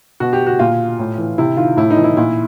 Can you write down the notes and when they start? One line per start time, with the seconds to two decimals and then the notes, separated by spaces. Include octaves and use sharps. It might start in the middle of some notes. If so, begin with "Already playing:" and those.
0.20 B2 F#4
0.33 G4
0.47 F#4
0.59 A#2 F4
0.99 A2
1.18 E3
1.38 C3 E4
1.57 D#3 F4
1.77 A2 E4
1.91 D#4
1.97 E3
2.04 E4
2.17 A#2 E4